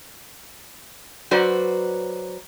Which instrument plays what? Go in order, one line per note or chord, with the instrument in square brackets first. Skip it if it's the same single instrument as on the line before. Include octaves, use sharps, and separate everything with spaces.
[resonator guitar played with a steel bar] F#3 F#4 B4 C5 D5